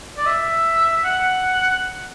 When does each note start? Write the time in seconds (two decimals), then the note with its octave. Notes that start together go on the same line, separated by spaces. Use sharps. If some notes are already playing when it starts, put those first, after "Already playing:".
0.17 D5
0.26 E5
1.04 F#5